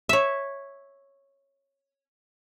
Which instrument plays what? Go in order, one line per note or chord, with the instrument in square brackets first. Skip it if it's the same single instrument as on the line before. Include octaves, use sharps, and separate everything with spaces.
[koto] C#5 E5